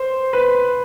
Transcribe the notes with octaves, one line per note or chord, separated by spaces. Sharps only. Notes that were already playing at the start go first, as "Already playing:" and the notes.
Already playing: C5
B4